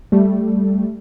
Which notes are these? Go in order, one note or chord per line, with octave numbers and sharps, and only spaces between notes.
G3 A3